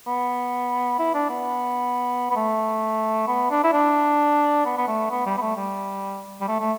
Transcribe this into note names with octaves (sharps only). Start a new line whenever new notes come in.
B3
E4
D4
B3
B3
A3
B3
D4
E4
D4
B3
B3
A3
B3
G3
B3
A3
G3
G3
A3
A3